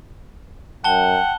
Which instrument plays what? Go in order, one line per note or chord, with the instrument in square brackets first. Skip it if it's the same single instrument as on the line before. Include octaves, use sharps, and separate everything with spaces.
[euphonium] F#2 [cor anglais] F#5 [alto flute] G5 [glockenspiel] A5 G7